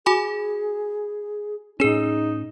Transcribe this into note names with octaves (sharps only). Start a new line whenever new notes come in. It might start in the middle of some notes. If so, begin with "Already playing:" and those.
F#4 G#4 G#5 B5
A2 C#4 D#4 G#4 E7